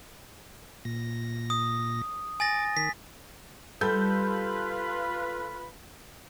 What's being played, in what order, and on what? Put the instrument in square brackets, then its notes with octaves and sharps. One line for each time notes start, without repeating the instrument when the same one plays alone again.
[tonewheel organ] A#2 A#6
[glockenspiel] D#6
[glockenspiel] G#5 A6 A#6 [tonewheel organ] D6
[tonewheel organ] D#3 [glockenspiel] B6
[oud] G3 [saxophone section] F4 B4 [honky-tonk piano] A4 G6 [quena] B5